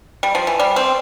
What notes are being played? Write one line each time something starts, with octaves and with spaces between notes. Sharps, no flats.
G3
F3
E3
G3
C4